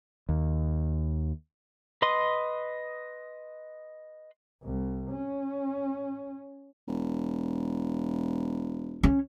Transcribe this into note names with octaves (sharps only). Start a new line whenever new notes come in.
D#2
B4 D#5 C6 D#6
C2
C#4
E1
C#4